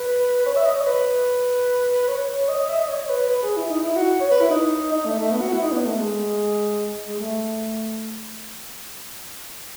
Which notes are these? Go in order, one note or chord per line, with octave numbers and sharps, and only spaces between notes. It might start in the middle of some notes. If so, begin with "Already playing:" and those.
Already playing: B4
C#5
E5
D#5
C#5
B4
C#5
D#5
D#5
E5
D#5
C#5
B4
B4
G#4
E4
D#4
E4
F#4
C#5
B4
E4
D#4
D#4
A3
A3
B3
F#4
E4
D#4
B3
A3
G#3
G#3
A3